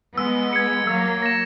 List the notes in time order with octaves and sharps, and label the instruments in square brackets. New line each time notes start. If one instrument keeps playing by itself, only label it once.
[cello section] G#3 B3 [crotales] E6
[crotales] G#6 C#7
[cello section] F#3 A#3 [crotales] E6
[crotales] A#6 E7